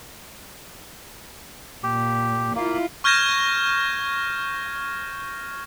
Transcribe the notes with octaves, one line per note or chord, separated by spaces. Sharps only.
A#2 G4
A#3 E4 F4
C#6 F6 G6 G#6 A#6 E7